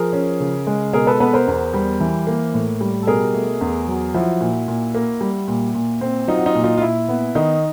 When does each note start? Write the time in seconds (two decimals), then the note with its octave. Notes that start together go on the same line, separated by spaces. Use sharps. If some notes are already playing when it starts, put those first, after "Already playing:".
Already playing: F3 G#4 A#4
0.13 C#4
0.40 C#3
0.67 G#3
0.93 B2 G#4 A#4
1.07 A4 B4
1.20 B3 A4 B4
1.33 A#4 C5
1.47 E2
1.74 G3
2.00 E3
2.27 A#3
2.54 A2
2.81 G3
3.03 A4
3.07 B2 G#4 A#4
3.34 A3
3.61 E2
3.88 F#3
4.14 F3 E4 F#4
4.41 A#2
4.68 A#2
4.95 A#3
5.21 G3
5.48 A#2
5.75 A#2
6.01 C4
6.28 F#3 D#4 F4
6.37 F#4
6.46 D#4 F4
6.55 A#2
6.64 D#4 F4
6.77 F4
6.82 A#2 E4
7.09 B3
7.35 D#3 D#4